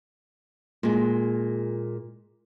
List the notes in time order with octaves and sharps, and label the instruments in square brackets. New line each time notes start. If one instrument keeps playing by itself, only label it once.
[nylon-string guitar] A#2 G#3